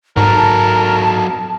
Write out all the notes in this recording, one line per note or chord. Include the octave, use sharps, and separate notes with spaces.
G#2 F#3 A4 A#4 A5